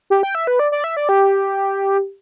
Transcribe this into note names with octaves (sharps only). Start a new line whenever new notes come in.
G4
G5
E5
B4
D5
D5
E5
D5
G4